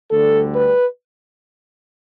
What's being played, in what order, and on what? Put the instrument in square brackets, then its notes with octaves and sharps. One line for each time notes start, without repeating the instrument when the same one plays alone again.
[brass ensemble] D2 D3 G3 A4
B4